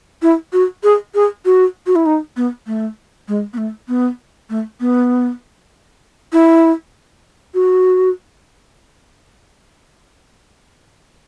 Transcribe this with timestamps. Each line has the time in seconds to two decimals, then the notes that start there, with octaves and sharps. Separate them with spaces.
0.22 E4
0.53 F#4
0.84 G#4
1.15 G#4
1.45 F#4
1.87 F#4
1.96 E4
2.06 D#4
2.37 B3
2.67 A3
3.28 G#3
3.53 B3
3.58 A3
3.88 B3
4.50 A3
4.80 B3
6.33 E4
7.54 F#4